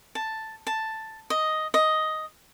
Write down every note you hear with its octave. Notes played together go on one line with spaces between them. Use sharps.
A5
A5
D#5
D#5